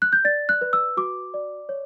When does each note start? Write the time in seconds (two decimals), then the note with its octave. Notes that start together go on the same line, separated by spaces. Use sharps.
0.02 F#6
0.13 G6
0.25 D5 A6
0.49 F#6
0.61 B4
0.73 E6
0.97 F#4 D6
1.34 D5
1.69 C#5